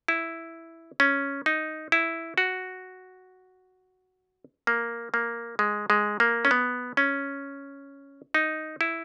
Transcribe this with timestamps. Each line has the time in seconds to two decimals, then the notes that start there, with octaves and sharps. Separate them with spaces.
0.08 E4
1.00 C#4
1.46 D#4
1.92 E4
2.38 F#4
4.67 A#3
5.14 A#3
5.59 G#3
5.90 G#3
6.20 A#3
6.45 C#4
6.51 B3
6.97 C#4
8.34 D#4
8.81 E4